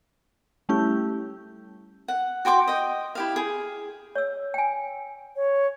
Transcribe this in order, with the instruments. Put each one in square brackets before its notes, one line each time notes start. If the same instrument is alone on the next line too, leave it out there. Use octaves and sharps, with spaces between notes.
[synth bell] G3 A3 C#4 E4 G4 G6
[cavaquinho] F#5
F#4 G5 C6 D6
D#5 G5
E4 G4 F5
G#4
[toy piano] C#5 E6
G5 G#5
[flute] C#5